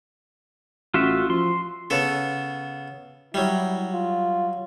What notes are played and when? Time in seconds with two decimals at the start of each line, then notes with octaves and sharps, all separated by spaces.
0.94 A1 F4 F#4 E5
1.30 F3 C6
1.90 C#3 B3 A4
3.34 F#3 G3 E4
3.93 F4